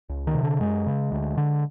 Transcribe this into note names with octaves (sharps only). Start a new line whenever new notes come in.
C#2
D#3
C3
D3
F#2 G#3
C#3
D2
D3